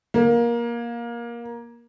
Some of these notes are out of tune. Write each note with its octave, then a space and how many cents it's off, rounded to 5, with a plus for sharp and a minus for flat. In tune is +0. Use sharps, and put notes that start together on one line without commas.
A#3 +20